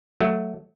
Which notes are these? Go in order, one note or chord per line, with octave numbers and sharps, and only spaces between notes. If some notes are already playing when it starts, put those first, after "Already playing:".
F#3 A3